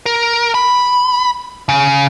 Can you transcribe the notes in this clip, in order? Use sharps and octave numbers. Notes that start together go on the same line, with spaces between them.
A#4
B5
C#3